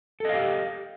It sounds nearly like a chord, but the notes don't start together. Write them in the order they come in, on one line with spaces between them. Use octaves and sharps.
A4 D#5 F5 G4